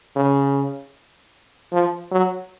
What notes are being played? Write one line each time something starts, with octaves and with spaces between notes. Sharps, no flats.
C#3
F3
F#3